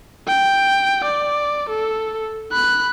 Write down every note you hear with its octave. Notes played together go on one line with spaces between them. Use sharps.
G5
D5
A4
B5 F#6